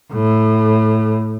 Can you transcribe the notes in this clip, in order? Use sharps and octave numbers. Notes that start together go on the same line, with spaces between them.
A2